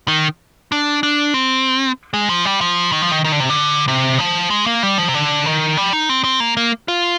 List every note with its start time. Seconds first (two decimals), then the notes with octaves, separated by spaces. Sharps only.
0.08 D#3
0.72 D4
1.03 D4
1.34 C4
2.14 G#3
2.29 F3
2.45 G3
2.61 F3
2.92 D#3
3.02 F3
3.11 D#3
3.24 D#3
3.32 D3
3.40 C3
3.49 D3
3.88 C3
4.19 F3
4.50 G#3
4.66 A#3
4.83 G3
4.98 F3
5.08 C3
5.14 D3
5.46 D#3
5.77 G3
5.93 D#4
6.09 C4
6.24 C4
6.40 A#3
6.57 A#3
6.88 F4